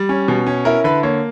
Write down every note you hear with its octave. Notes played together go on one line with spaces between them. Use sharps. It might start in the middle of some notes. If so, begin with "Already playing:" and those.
Already playing: G3
C#4
B2
C#4
E4 A#4
D3 B4
A#3 C#5